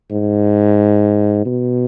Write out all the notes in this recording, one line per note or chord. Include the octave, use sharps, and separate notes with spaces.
G#2
B2